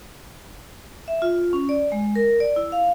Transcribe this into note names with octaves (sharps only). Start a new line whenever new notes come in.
E5
F4
C#4
D5
G#3
A#4
D5
E4
F5